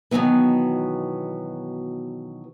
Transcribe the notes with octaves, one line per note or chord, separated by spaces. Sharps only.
B2 D#3 E3 F#3 B3